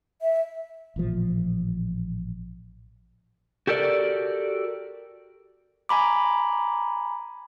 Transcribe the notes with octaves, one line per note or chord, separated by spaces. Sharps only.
E5
A1 A#2 F3
F#4 G4 A4 A#4 D5
G#5 A#5 B5 D6